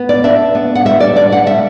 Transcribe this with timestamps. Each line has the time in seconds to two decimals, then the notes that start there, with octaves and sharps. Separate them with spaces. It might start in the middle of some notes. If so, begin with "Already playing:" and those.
Already playing: B3
0.09 D5
0.24 D4 E5
0.55 B3
0.75 F#5
0.85 G3 E5
1.00 D5
1.16 D4 D5
1.32 F#5
1.47 G3 E5